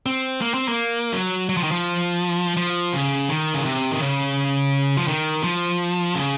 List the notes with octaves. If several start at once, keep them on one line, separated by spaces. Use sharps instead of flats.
C4
A#3
C4
A#3
F#3
F#3
F3
D#3
F3
F3
C#3
D#3
C#3
C3
D#3
C#3
F3
D#3
F3
C#3